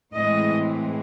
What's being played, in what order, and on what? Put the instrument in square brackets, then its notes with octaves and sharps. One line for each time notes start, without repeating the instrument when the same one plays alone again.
[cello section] A2 E3 G#3 C4 D#5